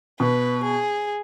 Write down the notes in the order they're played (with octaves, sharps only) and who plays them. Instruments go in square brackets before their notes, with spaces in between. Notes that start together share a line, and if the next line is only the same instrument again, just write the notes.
[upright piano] B2 [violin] B4
[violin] G#4